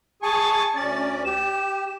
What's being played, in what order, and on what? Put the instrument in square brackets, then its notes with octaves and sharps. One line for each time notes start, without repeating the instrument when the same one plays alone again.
[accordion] G#4 G#5 C#6 [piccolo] A5
[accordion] D2 C#4 D5 [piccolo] A6
[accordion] G4 [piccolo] E7